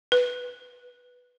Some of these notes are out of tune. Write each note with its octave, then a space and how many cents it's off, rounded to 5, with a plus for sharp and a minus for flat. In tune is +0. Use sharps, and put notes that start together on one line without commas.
B4 -5